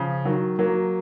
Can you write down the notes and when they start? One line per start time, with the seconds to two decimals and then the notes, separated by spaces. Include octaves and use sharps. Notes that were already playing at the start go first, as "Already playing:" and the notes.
Already playing: C#3 F3
0.25 D#3 F#3
0.59 F#3 A#3